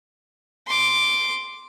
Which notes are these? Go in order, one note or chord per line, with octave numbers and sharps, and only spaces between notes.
C6 D6